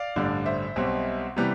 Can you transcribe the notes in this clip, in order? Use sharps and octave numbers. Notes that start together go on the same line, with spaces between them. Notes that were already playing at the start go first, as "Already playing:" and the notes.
Already playing: D5 F5
A1 G2 D3
C5 E5
B1 B2 G3 C4
C3 E3 G3 B3